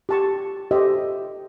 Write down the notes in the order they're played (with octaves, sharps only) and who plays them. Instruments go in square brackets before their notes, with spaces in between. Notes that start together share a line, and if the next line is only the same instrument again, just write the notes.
[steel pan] G4 A5 C#6
G4 A4 C5 D#5 E5